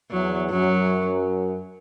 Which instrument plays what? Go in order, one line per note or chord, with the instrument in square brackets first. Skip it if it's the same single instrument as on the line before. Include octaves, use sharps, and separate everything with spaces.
[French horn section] E2 [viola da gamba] F#3
[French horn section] F#2 [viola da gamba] F#3